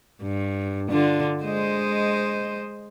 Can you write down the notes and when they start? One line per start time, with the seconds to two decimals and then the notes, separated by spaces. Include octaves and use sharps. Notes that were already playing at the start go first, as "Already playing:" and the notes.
0.22 G2
0.89 D3 D4 F4
1.43 G#3 C5 D#5